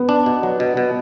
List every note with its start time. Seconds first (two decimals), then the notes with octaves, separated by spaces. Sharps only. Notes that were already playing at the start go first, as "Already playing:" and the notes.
Already playing: B3
0.09 D4
0.26 B2
0.43 F#3
0.60 B2
0.77 B2